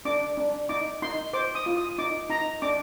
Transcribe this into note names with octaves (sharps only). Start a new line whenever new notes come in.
D4 D6
D4
D#4 D6
D#4 C6
C5 D6
D#6
F4
D#6
D#4 D6
D#4 A#5
D4 D6